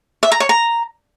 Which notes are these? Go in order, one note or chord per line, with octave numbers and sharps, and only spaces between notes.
E5
A#5
C#5
A#5